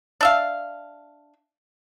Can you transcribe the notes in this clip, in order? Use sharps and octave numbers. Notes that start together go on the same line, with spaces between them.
D4 E5 F5